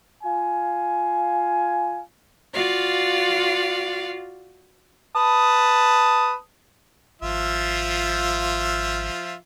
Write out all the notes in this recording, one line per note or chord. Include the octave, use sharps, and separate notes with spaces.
F4 F5 G#5
F4 F#4 D5 F5
B4 A5 D#6
G#1 F3 F4 E5